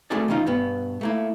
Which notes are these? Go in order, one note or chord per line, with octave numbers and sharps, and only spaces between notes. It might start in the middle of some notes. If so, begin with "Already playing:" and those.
A3 C4 F#4 G#4 A4 D5
D#3 E3 C#4 D#4 F4
G2 B2 B3
A3 A#3 E4